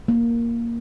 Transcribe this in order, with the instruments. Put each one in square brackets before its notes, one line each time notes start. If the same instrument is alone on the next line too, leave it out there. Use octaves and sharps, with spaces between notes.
[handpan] A#3